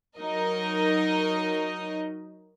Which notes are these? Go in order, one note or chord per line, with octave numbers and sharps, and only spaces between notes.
F#3 D#4 A#4 D#5